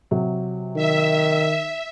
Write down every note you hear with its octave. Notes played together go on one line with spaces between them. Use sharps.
C3 F#3
D#3 E5